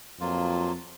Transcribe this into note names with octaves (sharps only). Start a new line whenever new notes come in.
F2 F#3 A#3 F4